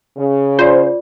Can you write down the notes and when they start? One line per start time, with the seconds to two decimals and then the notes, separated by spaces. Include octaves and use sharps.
0.17 C#3
0.59 F4 C5 D5